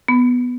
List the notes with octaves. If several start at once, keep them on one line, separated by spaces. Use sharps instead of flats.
B3